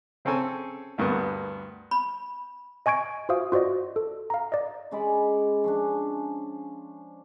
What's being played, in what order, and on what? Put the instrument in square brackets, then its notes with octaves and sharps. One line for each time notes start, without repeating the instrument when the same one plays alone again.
[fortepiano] C#3 C4 C#4 A4 G#5 E6
D2 G2 A#3 B3
[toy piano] B5
[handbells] D#5 G#5 C#6 G#6 D7
F4 F#4 C5 E5 F5 D#6
F4 F#4 C5 D5 D#5
A4
F5 A#5
D5 D#5
[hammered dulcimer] C#3 G#3 D5 B5
F3 C#4 D4